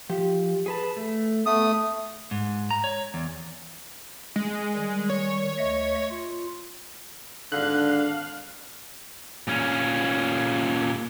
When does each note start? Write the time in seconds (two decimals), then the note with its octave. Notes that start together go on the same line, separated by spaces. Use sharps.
0.09 F3 G4
0.66 G#4 B4 A5
0.97 A3
1.46 A3 B3 D#6
2.31 G#2
2.71 A#5
2.84 C#5
3.14 E2
4.36 G#3
4.75 D#3 G3
5.10 C#5
5.58 D2 D#5 E5
6.10 F4
7.52 G#1 D3 D4 F5 F#6
9.48 A#2 C#4